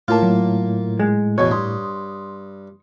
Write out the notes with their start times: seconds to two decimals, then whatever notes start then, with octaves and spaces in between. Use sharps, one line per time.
0.08 A2 A#3 F4 A5 F6
0.23 F#3
0.99 G#3
1.38 E2 B2 C#5
1.51 G2 C6 D#6